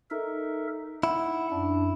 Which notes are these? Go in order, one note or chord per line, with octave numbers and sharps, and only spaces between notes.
D#4 A4 A#4 E5
E4 F#5
F#2 D4